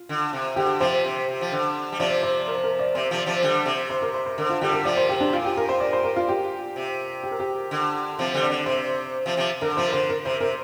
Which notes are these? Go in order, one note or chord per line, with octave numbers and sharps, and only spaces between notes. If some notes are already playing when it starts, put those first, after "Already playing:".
Already playing: F4
D3
C3
D3 G4
C3 F3 C5
C3
C3
F3
D3
G3
C3 F3 D5
C5
A#4
A#4
D5
C3 C5
C3 F3
C3 F3
D3 G3
C3
C5
A#4
C5
C5
D3 A#4
F4
D3 G3 G4
A#4
C3 F3 D5
C5
G4
D4
A#2 F4
G4
A#4
C5
D5
C5
A#4
F4
G4
C3
G4
A#4
G4
D3
C3 F3 C4
D3 G3
D5
D3
C3 C5
C3 F3
C3 F3
D3 A#4
C3 F3 C5
D3 C5
A#4
C3 C5
C3 A#4